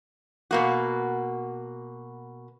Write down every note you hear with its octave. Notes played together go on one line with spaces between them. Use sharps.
B2 A#3 F#4